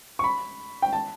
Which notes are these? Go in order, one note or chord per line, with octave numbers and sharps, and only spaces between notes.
C#6
B5
G5
A5